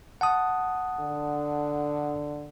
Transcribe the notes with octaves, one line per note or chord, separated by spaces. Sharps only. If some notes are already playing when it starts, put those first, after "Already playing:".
F#5 A5 D#6
D3